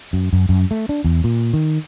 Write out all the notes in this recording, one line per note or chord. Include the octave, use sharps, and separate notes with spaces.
F#2
F#2
F#2
A3
D4
E2
A#2
D#3